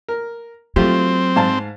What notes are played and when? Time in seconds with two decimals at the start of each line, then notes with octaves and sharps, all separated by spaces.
0.08 A#4
0.76 F#3 A3 C4 F4 G4
1.36 G#2 F5 A5